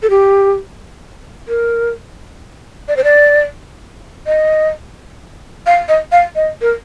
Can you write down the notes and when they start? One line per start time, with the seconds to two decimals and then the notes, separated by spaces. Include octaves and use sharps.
0.03 A4
0.10 G4
1.48 A#4
2.88 D5
2.97 C5
3.04 D5
4.27 D#5
5.66 F5
5.89 D#5
6.12 F5
6.36 D#5
6.62 A#4